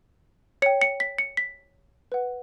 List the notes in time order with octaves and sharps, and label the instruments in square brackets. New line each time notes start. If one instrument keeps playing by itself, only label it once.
[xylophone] C#5 G5 C#7
C#7
B6
C#7
B6
B4 F#5